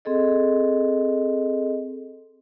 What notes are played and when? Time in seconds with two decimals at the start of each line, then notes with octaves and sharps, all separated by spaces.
0.05 C4 G#4 A4 D#5